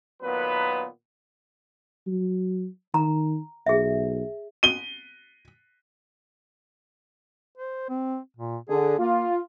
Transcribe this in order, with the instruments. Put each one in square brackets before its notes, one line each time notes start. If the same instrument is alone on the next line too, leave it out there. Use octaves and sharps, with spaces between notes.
[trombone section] A#2 D#3 F#3 B3 B4
[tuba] F#3
[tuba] D#3 [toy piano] A#5
[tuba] B1 [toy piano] G#4 E5
[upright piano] D#7 G7
[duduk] C5
C4
A#2
[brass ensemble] D3 [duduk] G#4
[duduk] A#3 [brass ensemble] F4